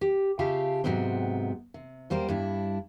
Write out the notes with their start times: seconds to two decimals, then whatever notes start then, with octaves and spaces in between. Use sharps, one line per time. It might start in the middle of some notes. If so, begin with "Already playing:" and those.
0.01 G4
0.39 C#3 F4 G4 E5 F5 A5
0.84 G#2 C3 F#3 B3 C4
1.74 C3
2.10 E2 G3 A#3 C5
2.28 G2 D4 E4